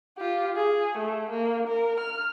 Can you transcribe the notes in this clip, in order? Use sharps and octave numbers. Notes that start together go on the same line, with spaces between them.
F4 G4
G#4
A3
A#3
A#4
F6